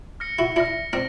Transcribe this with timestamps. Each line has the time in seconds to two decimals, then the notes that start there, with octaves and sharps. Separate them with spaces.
0.20 F6 A#6 C#7
0.39 E4 F#4
0.56 D4 E4 F6 A#6 C#7
0.93 C4 D4 F6 A#6